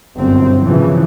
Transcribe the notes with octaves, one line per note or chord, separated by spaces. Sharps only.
G1 F#2 C4
A2 C#3 E3 F3